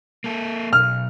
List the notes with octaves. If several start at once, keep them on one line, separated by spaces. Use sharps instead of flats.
A#3 A4
B1 F6